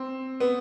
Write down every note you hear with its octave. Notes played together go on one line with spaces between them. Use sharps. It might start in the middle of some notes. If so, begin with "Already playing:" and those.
Already playing: C4
B3